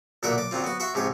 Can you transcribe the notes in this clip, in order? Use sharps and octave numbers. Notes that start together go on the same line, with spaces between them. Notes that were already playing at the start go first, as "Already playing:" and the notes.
B1 A#2 D3 A#4 E5 F#5
D5
D3 F#3 C4 F4
B3 F#4
F#4 E5 C6 C#6
G#2 C3 F3 C#5